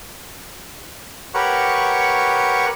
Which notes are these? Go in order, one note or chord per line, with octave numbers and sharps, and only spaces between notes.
G4 A#4 B4 C#5 F#5 C#6